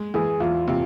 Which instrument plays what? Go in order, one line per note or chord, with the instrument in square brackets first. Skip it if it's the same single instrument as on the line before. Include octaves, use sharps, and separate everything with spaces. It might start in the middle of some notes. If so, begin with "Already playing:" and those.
Already playing: [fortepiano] G#3
[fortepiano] E3 [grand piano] G#4
[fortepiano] E2 [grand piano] F4
[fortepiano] C3 [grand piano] F4